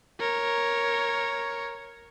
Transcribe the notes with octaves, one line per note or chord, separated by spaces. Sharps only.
A#4 C#5